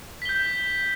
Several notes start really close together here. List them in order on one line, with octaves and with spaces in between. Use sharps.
B6 G7 G6